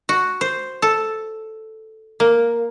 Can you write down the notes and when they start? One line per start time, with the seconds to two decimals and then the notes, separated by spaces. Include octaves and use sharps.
0.09 F#4
0.41 C5
0.82 A4
2.20 A#3